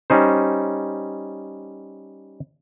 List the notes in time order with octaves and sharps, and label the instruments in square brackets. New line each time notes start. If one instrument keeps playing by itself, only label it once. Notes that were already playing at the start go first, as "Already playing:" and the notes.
[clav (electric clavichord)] G3 C#4 D#4 C5